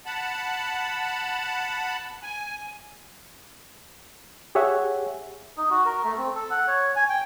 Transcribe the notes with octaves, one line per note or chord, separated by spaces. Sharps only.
F#5 A5 B5
G#5
G4 G#4 C#5 E5 F#5 G#5
D#4
F#4
A#4
A3
C4
A4
F#5
C#5
G#5
G5